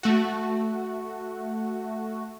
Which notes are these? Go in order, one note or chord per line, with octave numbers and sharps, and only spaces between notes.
A3 F#4